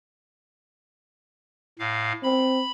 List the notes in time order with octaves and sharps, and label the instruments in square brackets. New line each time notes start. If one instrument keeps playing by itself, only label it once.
[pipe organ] A2 F5
[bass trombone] C4 [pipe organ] B5